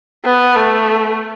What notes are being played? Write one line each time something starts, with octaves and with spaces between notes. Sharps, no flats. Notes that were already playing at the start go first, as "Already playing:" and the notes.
B3
A3